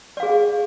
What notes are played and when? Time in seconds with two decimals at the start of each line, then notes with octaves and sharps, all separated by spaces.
0.17 D5
0.20 F5
0.23 G#4